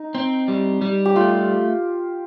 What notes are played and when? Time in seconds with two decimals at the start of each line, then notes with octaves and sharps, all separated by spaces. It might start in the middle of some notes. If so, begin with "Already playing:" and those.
Already playing: D#4
0.15 C4
0.48 G3
0.82 G3
1.05 G4
1.16 A3 F4